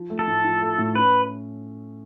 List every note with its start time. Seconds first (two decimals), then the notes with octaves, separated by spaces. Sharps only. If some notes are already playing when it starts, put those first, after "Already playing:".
Already playing: F3
0.10 A3
0.19 A4
0.27 A2
0.45 F3
0.61 A3
0.78 A2
0.95 C#4 B4